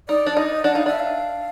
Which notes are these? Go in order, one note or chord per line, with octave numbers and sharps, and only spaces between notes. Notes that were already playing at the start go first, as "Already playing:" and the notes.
D#4 D5
D4
D#4 D#5
D4 F#5
D#4 F5
D4 E5
F5